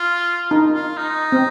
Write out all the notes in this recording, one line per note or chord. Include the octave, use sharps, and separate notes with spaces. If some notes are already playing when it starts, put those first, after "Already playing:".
Already playing: F4
D#4
F4
D#4
C4